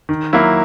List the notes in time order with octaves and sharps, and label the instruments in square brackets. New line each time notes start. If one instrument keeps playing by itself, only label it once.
[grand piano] D#3
F#3 A#3 E4